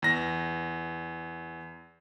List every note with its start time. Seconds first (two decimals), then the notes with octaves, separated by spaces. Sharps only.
0.02 E2 A#6